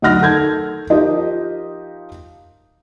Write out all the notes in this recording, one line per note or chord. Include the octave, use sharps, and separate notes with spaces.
D2 F#3 D#4 F#5 F6 A#6
D#3 A4 G6 G#6
F3 D#4 F4 G4 A#4 D#5